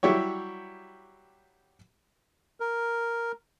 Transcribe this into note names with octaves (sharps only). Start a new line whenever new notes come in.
F#3 G3 E4 G4 C#5
A#4